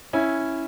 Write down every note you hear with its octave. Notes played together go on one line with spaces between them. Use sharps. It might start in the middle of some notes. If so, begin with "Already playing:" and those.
C#4 E4